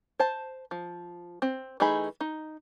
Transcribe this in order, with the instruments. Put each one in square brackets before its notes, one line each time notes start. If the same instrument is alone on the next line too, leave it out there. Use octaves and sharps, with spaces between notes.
[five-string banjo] C5 A5
F3
C4
E3 A3 D#4 G#4 B5
D#4